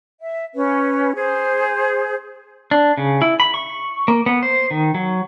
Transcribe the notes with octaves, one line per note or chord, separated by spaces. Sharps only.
E5
C#4 B4
G#4 C5
D4
C#3
E4
B5
C#6
A#3
B3
C5
D#3
F#3